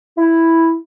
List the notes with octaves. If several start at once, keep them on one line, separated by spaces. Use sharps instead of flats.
E4